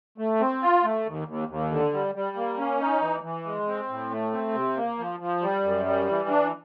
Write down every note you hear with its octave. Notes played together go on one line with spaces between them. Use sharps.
A3
C4
F4
A3
D#2
D#2
D#2
D3
G3
G3
A#3
C#4
D#4
E3
E3
G#3
C4
A2
A3
C4
C3
A#3
F3
F3
G3
F#2
G3
E3
D4